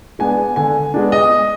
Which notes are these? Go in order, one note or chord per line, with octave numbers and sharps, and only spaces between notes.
G#3 B3 D4 G#5
D3 G#5
G#3 B3 D4
D#5